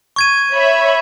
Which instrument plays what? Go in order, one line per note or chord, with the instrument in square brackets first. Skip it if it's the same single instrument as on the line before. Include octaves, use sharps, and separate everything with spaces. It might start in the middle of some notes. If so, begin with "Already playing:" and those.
[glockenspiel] C#6 G#6 D#7
[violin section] C#5 E5 B5